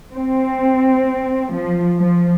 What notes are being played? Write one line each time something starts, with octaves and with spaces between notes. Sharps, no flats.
C4
F3
F3